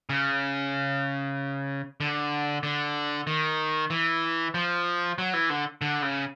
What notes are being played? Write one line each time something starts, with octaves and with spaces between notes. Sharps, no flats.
C#3
D3
D3
D#3
E3
F3
F#3
E3
D3
D3
C#3